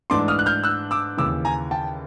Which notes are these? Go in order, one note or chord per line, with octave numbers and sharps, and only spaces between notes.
G#2 E3 A3 D4 C6 D6
D#6 F6
F#6
F6 G6
E6 F#6
D6 E6
D#2 C#3 E3 D6 E6
G#5 A#5
G5 A5